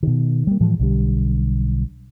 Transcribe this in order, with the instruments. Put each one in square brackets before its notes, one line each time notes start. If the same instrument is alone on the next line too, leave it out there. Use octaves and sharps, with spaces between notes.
[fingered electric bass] B2 D#3
G3 A#3
A2 E3 F3 G#3
B1 D3 G3